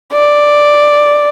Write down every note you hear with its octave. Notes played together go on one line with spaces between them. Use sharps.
D5